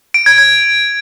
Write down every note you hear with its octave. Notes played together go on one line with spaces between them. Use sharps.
D7
G#6
G#6